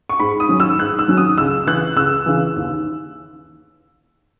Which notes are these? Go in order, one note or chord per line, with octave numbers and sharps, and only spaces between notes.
C#6
G#2 B5
D#6
D#3 F#3 C#4
E6
G#2 F#6
E6
D#3 F#3 C#4
D#6
C#2 E6
C#3 E3 F#6
C#2 E6
C#3 E3
D#2